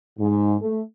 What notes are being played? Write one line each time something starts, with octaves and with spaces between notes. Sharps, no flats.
G#2
A3